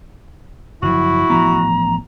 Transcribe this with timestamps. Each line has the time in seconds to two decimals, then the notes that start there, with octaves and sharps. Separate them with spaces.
0.82 F#1 F3 E4 F#4
1.30 A1 F3 B3 A#5